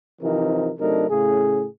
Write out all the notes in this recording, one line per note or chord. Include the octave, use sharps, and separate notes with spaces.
C3 E3 F3 C4 D#4 A#4
C3 F#3 A3 D4 D#4 A#4
A2 C#3 G#4